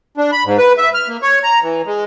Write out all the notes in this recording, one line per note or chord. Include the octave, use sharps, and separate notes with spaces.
D4
B5
G#2
B4
E5
F6
A#3
C#5
A#5
E3
G#3